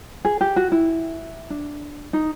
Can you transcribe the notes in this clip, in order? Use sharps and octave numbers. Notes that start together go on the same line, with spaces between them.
G#4
G4
F#4
E4
D4
D#4